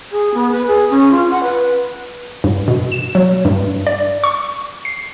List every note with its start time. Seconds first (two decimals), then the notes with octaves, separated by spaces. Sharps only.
0.12 G#4
0.34 B3
0.52 B4
0.67 G#4
0.90 C#4
1.11 F4
1.31 F#5
1.43 B4
2.44 G2
2.68 B2
2.92 E7
3.15 F#3
3.45 G2
3.87 D5
4.24 C#6
4.85 C7